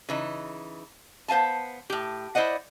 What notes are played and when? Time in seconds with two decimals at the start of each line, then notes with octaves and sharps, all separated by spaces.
0.09 C#3 E3 D#4
1.28 B3 C5 F5 G#5 A5
1.90 A2 G4
2.35 E4 C5 D5 D#5 F#5